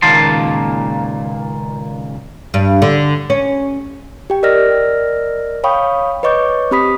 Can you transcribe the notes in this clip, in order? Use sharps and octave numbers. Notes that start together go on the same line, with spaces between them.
C#2 A#2 D#3 A#3 A5 C6
G2
D3
C#4
G4 G5
A#4 D5 D#5 F6 A#6
C#5 F5 G5 B5 C#6 D#6
B4 C#5 D#5 C#6 D6 G6
C4 G4 B5 D#6 B6